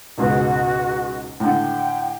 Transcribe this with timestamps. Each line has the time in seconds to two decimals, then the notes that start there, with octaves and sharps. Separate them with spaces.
0.18 C#2 G#2 B2 F#4
1.40 A2 D3 G5